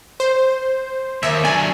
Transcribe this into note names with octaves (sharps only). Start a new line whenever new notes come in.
C5
D#2 E5
F#3 D4 G#5